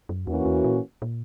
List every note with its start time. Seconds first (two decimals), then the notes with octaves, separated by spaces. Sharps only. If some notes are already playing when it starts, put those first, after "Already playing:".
0.09 F#2
0.27 E2 E3 A#3 C#4 F#4
0.45 E2
0.64 A#2
1.02 A#2